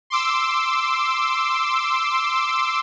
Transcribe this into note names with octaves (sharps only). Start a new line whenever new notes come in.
C6 D6 E6